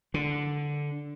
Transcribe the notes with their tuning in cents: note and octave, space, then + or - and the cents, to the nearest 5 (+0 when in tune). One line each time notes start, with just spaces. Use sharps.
D3 -5